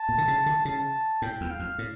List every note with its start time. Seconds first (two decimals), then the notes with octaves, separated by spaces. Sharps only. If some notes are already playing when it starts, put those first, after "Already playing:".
Already playing: A5
0.09 A#2
0.18 D3
0.28 C#3
0.46 D3
0.65 C#3 A5
1.22 A2 G5
1.41 E2
1.50 F5
1.59 F2
1.78 A2